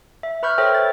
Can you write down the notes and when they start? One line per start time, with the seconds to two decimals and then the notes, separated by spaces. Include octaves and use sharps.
0.23 E5
0.43 B4 B5 C#6 F6 G6
0.58 A4 C5 C#5 E5 G5
0.75 A6